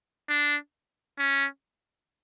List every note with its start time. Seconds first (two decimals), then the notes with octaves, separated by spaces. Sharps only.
0.29 D4
1.19 C#4